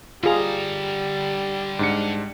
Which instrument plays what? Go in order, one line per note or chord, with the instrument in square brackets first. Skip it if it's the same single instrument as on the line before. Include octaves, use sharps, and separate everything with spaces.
[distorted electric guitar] D3 A#5 [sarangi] G3 [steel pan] F4 G#4
[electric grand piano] G#2 D4 C#7